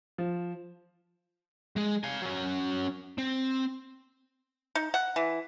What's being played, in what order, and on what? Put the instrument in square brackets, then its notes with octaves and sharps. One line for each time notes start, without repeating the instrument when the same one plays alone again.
[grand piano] F3
[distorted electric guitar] G#3 G#4
F5 G#5
F#3 C#4
C4
[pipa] D#4
F#5
E3